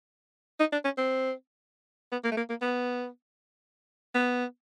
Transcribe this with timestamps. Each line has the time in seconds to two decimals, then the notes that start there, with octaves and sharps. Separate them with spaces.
0.60 D#4
0.72 D4
0.84 C#4
0.98 C4
2.12 B3
2.24 A#3
2.32 A3
2.37 A#3
2.50 A#3
2.62 B3
4.14 B3